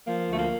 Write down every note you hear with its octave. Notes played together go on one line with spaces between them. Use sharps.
F3 A#3
D2 A3
A#3